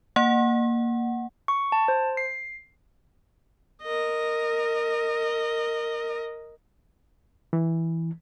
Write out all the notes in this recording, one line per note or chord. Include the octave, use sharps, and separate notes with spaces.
A#3 F#5
C#6
A5
C5
C7
A#4 D#5
E3